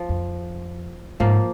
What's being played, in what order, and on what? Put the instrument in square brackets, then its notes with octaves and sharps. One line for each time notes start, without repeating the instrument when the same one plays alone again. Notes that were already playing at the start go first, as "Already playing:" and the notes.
Already playing: [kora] F3
[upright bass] F2
[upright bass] G#2 [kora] F3 A#3